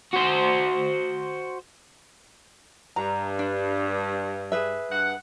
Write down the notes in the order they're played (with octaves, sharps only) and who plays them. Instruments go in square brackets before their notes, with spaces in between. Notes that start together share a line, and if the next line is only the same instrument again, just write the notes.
[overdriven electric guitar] F#4 C5
[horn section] G2 [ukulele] A#5
[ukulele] D4
G#4 B4 E5
[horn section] G2 F#5